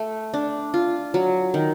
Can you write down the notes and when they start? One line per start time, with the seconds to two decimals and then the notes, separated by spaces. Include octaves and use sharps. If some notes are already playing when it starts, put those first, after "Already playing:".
Already playing: A3
0.34 D4
0.74 F4
1.14 F#3
1.54 D#3